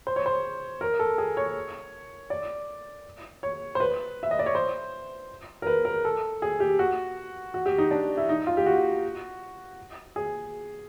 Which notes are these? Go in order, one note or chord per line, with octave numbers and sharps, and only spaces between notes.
C5
C#5
C5
A#4
A4
G#4
C#5
D5
C#5
C5
B4
E5
D#5
D5
C#5
C5
A#4
B4
A#4
A4
G#4
G4
F#4
F#4
G4
D#4
D4
E4
D#4
F4
G4
F#4
G#4